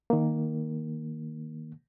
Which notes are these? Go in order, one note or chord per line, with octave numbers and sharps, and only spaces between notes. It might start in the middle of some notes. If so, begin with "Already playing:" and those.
D#3 A#3